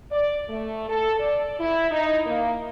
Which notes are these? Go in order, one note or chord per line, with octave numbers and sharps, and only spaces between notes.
D5
A3
A4
D5
E4
D#4
A#3